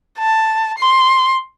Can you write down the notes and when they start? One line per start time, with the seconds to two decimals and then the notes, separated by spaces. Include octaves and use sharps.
0.19 A5
0.78 C6